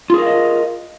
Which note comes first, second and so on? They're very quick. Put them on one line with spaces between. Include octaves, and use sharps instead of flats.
F4 G#4 A#4 F5 D#5